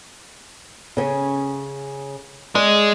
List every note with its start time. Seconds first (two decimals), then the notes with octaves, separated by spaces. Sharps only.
0.97 C#3 C#4
2.55 G#3 D5